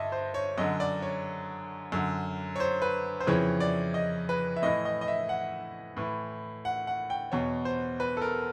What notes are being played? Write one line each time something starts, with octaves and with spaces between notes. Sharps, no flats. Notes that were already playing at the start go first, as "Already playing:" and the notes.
Already playing: G2 D3 D#5 E5
C5
C#5
F#2 D3 D#5
D5
C#5
F#2 D3
C#5
C5
B4
C5
F2 C#3 E3 C#5
D5
D#5
B4
E5
A2 E3 D#5
D#5
D#5
E5
F#5
A2 E3
F#5
F#5
G5
E2 B2 C#5
C5
B4
A4
A#4